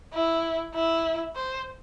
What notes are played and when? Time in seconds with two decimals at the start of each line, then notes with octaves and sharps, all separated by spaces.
0.14 E4
0.75 E4
1.36 C5